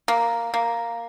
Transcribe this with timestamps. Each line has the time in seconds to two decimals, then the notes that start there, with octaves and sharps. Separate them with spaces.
0.08 A#3
0.54 A#3